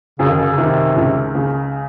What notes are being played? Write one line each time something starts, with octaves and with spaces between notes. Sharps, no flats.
F#2 C#3
D#3
C#3
C#3
C3 D#3
C#2
C#3